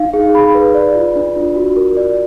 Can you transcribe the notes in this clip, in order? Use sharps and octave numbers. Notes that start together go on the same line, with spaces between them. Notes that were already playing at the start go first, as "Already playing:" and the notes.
Already playing: D#4 F5
G#4
G#4 B5
B4
D5
F4
D4
F4
F#4
A#4
D5